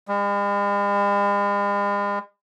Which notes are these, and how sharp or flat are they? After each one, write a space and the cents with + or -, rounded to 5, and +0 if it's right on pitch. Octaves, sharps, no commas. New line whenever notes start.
G#3 -45